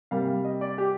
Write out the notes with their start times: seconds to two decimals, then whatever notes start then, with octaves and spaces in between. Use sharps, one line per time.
0.11 C3 G3 A#3 F5
0.27 F5
0.45 D#5
0.61 D5
0.78 G4